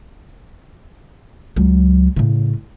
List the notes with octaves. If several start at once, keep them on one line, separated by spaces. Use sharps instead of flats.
C#2 F#3
A2 C#3